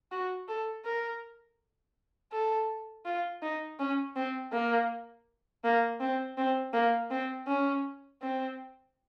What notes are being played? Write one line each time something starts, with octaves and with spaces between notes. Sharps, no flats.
F#4
A4
A#4
A4
F4
D#4
C#4
C4
A#3
A#3
C4
C4
A#3
C4
C#4
C4